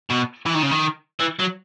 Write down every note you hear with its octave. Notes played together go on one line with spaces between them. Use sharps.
B2
E3
D#3
C#3
D#3
E3
F#3